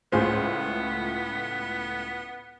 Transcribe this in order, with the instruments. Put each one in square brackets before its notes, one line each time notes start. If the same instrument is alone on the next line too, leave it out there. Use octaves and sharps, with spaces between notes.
[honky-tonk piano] C#2 A2 F4 [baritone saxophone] B3 [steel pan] G#4 C5